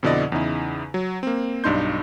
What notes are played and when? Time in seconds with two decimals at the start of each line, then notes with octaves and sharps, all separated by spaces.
0.03 F2 B2 D3 E4 D5 D#5
0.32 E2 C#3 D#4 E4
0.94 F#3
1.23 A#3 C4
1.64 B1 G2 D4 D#4 C6 G6